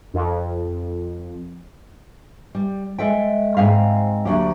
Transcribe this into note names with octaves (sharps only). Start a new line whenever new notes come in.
F2
G3
G#3 A4 E5 G5
G#2 C4 G#4 E5 F5
D2 D3 F#3 A#3 G4